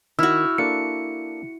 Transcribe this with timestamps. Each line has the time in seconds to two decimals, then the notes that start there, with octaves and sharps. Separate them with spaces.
0.19 D#3 E4 F#4 E6 F6
0.58 A#3 D4 A4 C#7